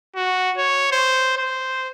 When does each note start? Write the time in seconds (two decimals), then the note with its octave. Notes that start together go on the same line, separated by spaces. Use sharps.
0.16 F#4
0.57 C#5
0.92 C5
1.37 C5